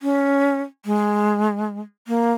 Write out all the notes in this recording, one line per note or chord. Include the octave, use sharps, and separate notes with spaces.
C#4
G#3
A#3